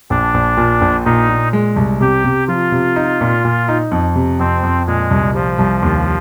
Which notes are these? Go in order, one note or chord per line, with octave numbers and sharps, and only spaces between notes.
A#1 D4
A#1
A#2
A#1
A#2 D#4
A#2
G#3
C2
C3 G4
C3
F3 F4
C3
D#4
A#2
A#2
D#4
F2
C3
F2 C4
F2
A#2 G#3
C2
F3 G3
C2
D#2